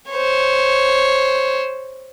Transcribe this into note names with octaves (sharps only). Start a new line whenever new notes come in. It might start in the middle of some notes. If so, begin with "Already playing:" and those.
C5 C#5